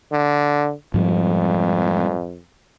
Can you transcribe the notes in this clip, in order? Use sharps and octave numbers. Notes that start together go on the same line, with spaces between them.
D3
F2 G#2 F3 G3